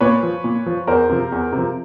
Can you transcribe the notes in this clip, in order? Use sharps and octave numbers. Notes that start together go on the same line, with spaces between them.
A#2 B4 C#5
F3
A#2
F3
E2 A#4 C5
C3 F3
E2
C3
F3